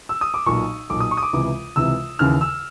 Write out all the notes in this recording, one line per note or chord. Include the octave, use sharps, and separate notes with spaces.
E6
D#6
D6
B1 A#2 C#6
B1 A#2 D6
D#6
C#6
D#6
D6
C#2 C3 E3 D6
C#2 C3 E3 E6
D#2 C#3 E3 F6
E6